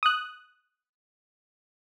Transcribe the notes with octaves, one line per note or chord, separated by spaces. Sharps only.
D#6 F#6